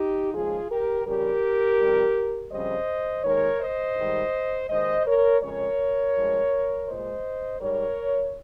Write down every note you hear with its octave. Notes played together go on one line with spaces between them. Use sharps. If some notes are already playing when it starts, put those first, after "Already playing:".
Already playing: D#4 G4
D#2 C#3 F3 G#3 F4 G#4
G4 A#4
F2 C#3 G3 G4 A#4
F2 C3 G3
F2 C#3 G3 C5 D#5
D#2 D#3 G#3 A#4 C#5
C5 D#5
G#2 D#3 G3
D#2 D#3 G#3 C5 D#5
A#4 C#5
F2 C#3 G#3 A#4 C#5
G2 F3 G#3
A#2 G#3 C5 D#5
G#2 G3 A#4 C#5